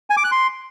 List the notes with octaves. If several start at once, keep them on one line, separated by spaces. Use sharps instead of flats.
G#5
D6
F#6
C6